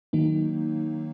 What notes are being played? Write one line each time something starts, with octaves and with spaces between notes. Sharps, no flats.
D#3 F#3 A#3 D#4